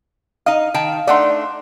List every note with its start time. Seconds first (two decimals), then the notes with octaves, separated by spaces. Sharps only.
0.46 D#4 D#5 F5
0.74 D#3 G5 A5
1.07 A3 D4 D#4 D5 F#5 C6